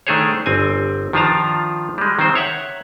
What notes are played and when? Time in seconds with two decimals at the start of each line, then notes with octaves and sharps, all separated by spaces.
0.07 D#3 A3 D4 G#4 C5 C#5
0.46 G1 C4 G#5
1.13 D#3 F3 D4 F4 A5 A#5
1.98 G3 G#3
2.19 D#3 C4 C5
2.35 C#5 E5 F#5